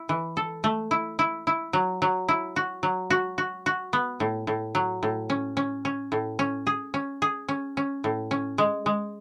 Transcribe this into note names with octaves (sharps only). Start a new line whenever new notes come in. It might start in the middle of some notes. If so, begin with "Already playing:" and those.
Already playing: E4
E3
A4
A3
E4
E4
E4
F#3
F#3
E4
F#4
F#3
F#4
F#4
F#4
B3
A2
A2
F#3
A2
C#4
C#4
C#4
A2
C#4
G#4
C#4
G#4
C#4
C#4
A2
C#4
G#3
G#3